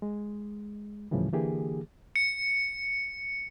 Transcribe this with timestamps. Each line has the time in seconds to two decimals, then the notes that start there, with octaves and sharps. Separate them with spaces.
0.02 G#3
1.11 D2 A2 C#3 E3 F3 G3
1.33 D3 E3 A#3 G4 G#4
2.16 C#7